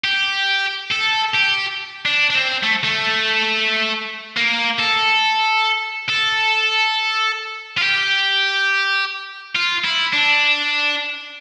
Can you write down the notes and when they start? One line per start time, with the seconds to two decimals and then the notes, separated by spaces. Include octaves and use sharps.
0.04 G4
0.91 A4
1.34 G4
2.06 D4
2.30 D4
2.35 C4
2.63 A3
2.84 A3
4.37 A#3
4.79 A4
6.09 A4
7.77 F4
7.82 G4
9.55 F4
9.84 E4
10.13 D4